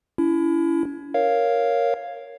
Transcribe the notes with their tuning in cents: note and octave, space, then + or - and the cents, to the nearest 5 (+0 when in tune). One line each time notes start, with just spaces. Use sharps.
C#4 +45 E4 +20
A#4 +0 C#5 +0 F5 +0